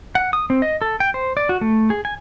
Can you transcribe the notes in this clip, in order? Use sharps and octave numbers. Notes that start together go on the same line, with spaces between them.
F#5
D#6
C4
D#5
A4
G5
C5
D5
F#4
A3
G#4
G#5